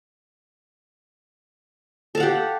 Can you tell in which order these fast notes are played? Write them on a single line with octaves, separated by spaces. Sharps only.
A4 F5 F#5 G4